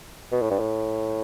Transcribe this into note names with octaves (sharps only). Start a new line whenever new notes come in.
B2
A2
G2
A2